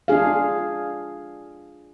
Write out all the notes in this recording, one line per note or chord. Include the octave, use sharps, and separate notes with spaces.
D4 F4 G#4 F5